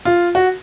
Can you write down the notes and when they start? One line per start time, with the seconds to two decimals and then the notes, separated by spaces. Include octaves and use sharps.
0.05 F4
0.35 F#4